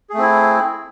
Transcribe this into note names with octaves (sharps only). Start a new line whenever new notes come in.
A3 C4 E4 G#4